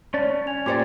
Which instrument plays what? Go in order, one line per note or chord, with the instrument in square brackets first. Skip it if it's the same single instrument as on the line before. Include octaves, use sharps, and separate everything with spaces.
[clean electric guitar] C#4 A5 [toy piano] C#5 D5
[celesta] G#5 G#6 F7
[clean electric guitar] A#2 [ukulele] G4 C5 D5 [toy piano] D6 [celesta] G#6 C#7